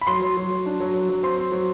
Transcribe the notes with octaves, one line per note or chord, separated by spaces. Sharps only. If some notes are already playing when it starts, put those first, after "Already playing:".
B5
F#3 C6
F#3
F#3
F#3
D4
F#3
F#3
F#3
C4 C6
C4
F#3